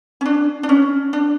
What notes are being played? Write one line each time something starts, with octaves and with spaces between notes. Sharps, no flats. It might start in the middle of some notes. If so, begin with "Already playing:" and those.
C#4
D4
D4
C#4
D4